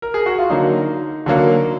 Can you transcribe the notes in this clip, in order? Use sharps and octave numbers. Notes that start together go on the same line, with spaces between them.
A#4
G#4
F#4
F4
D3 F#3 A#3 D#4
D3 F#3 A#3